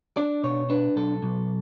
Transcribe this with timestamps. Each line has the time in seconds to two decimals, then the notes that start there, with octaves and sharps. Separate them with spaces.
0.17 D4 D5
0.43 B2 C#5
0.70 D4 B4
0.96 B1 A4
1.23 B1